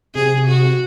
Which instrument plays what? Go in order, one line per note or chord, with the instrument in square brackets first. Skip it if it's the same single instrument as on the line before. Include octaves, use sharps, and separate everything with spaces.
[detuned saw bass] C3 [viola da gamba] G#4
[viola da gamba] F#4